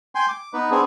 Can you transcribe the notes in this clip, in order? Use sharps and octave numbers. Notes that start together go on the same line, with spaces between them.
G5 G#5 C6
D6
B3 D#4 B4
B3 C4 D4 G#4